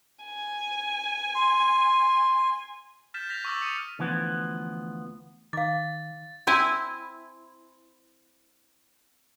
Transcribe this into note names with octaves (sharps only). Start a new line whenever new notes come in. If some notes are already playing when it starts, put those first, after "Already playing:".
G#5
C6
F6 G6 A6 B6 E7
F6 A#6 B6 F7
C#6 D6 E6 F6 A6
D#6 C#7 D#7 F7
D2 E3 F3 B3
D#3 F5 D6 A6
C4 E4 G#5